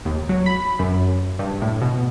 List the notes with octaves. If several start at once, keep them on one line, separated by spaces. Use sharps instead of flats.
D#2
F#3
B5
F#2
G2
A2
B2